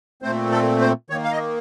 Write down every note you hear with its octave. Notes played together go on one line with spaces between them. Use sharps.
A#2 A3 C4 C5
A4
C5
D#3 A#3 C#5
F5
D#5